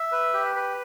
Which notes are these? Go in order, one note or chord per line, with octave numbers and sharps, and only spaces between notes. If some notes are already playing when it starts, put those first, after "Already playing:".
Already playing: E5
B4
G4
B4